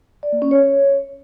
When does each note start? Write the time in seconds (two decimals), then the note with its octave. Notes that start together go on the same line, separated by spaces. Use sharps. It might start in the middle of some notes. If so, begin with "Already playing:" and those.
0.23 D5
0.32 A#3
0.42 C#4
0.51 C#5